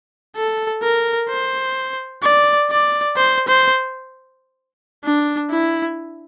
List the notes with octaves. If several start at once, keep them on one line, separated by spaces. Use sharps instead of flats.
A4
A#4
C5
D5
D5
C5
C5
D4
E4